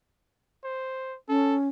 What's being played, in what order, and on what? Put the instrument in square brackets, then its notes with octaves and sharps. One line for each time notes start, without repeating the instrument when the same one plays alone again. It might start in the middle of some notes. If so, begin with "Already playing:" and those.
[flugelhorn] C5
[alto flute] C#4 [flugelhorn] A4